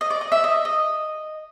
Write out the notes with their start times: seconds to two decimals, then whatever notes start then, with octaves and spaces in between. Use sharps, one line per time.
0.01 D#5
0.10 D5
0.21 D#5
0.32 E5
0.44 D#5
0.65 D#5